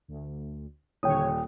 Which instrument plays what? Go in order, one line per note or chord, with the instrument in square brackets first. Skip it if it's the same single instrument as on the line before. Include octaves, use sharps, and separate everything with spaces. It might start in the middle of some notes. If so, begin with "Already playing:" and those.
[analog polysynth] D2
[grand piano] D#1 [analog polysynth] D3 C#5 [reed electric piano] G5 D#6